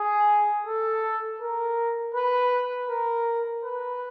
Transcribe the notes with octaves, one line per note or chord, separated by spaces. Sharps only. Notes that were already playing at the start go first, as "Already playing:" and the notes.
Already playing: G#4
A4
A#4
B4
A#4
B4